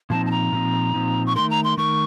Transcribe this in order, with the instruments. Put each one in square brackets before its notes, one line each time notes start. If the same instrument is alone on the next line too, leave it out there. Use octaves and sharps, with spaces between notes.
[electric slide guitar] A#2 F3 C4 D#4 [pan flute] A5
[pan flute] A5
A#5
[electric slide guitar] A#2 F3 C4 D#4
A#2 F3 C4 D#4
[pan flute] C#6
[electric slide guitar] D#3 A3 D#4 A#4 [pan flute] C6
[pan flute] A#5
C6
[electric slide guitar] D#3 A3 D#4 A#4 [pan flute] C#6